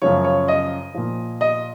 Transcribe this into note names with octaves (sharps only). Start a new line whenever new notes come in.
F#2 C#3 F3 C#5
C#5
D#5
A#2 F3
D#5